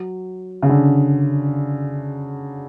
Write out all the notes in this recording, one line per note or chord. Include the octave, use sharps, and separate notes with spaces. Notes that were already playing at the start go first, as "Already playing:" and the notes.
Already playing: F#3
C#3
D3